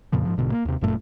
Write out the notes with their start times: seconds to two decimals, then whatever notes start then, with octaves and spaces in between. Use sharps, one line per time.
0.12 F2 A#2 C#3 F3
0.25 G#2 C3 F3
0.37 A#1 G#2 B2 D3
0.52 A#3
0.65 D#2 C3
0.81 G1 F#2 A#2 A3